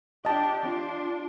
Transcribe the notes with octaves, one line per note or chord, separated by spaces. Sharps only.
D4 G4 D#5 A5
D4 F4